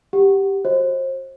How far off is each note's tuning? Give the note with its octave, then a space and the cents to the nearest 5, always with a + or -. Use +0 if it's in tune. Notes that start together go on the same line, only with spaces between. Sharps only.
G4 +0 F#5 +10
F#4 -10 C5 +30 D#5 +25